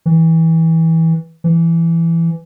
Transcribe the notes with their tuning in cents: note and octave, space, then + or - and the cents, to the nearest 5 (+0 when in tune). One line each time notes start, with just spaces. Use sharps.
E3 -20
E3 +15